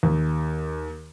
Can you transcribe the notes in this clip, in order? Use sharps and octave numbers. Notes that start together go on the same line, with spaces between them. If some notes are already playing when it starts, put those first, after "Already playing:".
D#2